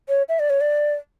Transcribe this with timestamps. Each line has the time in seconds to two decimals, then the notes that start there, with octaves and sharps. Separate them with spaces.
0.09 C#5
0.29 E5
0.39 D5
0.50 C#5
0.61 D5